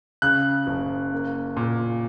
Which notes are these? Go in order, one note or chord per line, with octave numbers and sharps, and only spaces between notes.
C#3 F#6
F#1
A#3
A#2